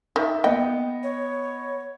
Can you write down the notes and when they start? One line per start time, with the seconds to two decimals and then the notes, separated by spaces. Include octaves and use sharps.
0.16 D#3 E5
0.44 B3 D#5 G5
1.03 C#5